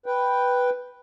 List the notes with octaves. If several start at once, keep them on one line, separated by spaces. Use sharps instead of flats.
B4 G5